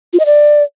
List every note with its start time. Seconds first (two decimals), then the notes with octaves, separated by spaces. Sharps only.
0.13 F4
0.19 D#5
0.26 D5